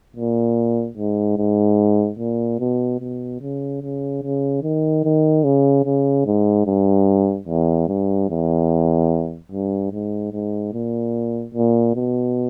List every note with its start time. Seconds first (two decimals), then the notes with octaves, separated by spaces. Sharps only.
0.16 A#2
0.97 G#2
1.38 G#2
2.19 A#2
2.60 B2
3.01 B2
3.41 C#3
3.82 C#3
4.23 C#3
4.63 D#3
5.04 D#3
5.44 C#3
5.85 C#3
6.26 G#2
6.66 G2
7.48 E2
7.88 G2
8.29 E2
9.52 G2
9.92 G#2
10.32 G#2
10.73 A#2
11.54 A#2
11.95 B2